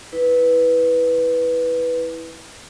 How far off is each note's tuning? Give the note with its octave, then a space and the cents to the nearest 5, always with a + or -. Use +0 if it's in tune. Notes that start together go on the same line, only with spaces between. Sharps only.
E4 -15 B4 +0